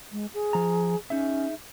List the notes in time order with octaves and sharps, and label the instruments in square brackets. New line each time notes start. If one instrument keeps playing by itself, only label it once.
[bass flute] G#3
G#4
[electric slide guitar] F3 A#5
[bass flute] C#4 [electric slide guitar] D#4 G#4 E5